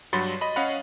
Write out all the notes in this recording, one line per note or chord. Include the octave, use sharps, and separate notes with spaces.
G2 F#3 F#5 B5 C6 A6
D#5 B5
C#4 D#5 F5 F#5 B5